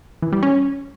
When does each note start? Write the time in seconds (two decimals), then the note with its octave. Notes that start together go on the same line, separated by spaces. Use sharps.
0.22 E3
0.32 G3
0.43 C#4